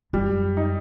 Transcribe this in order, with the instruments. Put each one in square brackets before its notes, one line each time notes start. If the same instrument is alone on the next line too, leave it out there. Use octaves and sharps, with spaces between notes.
[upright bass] F#2 [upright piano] G3
[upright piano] D#4